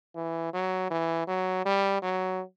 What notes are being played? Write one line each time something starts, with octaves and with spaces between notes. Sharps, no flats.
E3
F#3
E3
F#3
G3
F#3